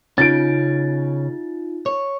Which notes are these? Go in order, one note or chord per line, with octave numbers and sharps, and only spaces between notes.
C#3 C#4 D#4 F4 A6 D7
C#5